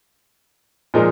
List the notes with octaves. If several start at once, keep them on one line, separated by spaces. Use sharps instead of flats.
A#2 F3 G#3 D#4 A#4